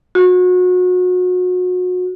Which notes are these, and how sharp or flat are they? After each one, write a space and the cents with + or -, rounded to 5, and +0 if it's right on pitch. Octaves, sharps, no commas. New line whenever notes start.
F#4 -30